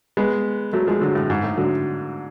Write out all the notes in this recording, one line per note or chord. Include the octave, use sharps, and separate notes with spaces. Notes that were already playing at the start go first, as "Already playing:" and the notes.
G#3 B3
F#3 A3
F3 G#3
D3 F#3
A2
G#2
A2
D3 F#3